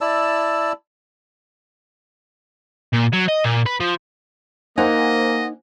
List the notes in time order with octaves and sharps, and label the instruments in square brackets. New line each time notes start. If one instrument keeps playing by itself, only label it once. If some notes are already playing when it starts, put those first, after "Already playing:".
[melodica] E4 D5 A5 E6
[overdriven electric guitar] A#2
F#3
D#5
A#2
B4
F3
[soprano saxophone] A#3 [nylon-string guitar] D#4 [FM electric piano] C5 F#5 G#5 [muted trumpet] D#5